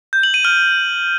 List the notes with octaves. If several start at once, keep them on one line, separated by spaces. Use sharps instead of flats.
G6
F#7
D#7
F6